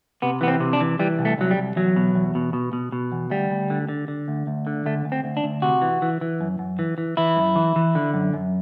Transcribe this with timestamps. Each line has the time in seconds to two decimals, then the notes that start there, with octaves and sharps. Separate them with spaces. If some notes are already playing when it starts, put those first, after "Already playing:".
0.22 C3 B3
0.41 E3 B3
0.48 C4
0.60 C3
0.73 D4
0.81 E3
0.99 E3 G3
1.19 C2
1.25 A3
1.38 C2 F#3
1.51 G3
1.57 C2
1.76 E2 F#3
1.96 B2
2.15 E2
2.35 B2
2.53 B2
2.73 B2
2.92 B2
3.12 E2
3.30 D2 G3
3.51 D2
3.70 D3
3.89 D3
4.08 D3
4.28 D2
4.47 D2
4.67 D3
4.86 D2 A3
5.05 D2
5.12 C4
5.24 D2
5.37 D4
5.44 D2
5.62 C3 F#4
5.82 E3
6.02 E3
6.21 E3
6.41 F#2
6.59 F#2
6.79 E3
6.98 E3
7.17 E3 E4
7.37 F#2
7.56 E3
7.76 E3
7.95 D3
8.14 F#2
8.33 F#2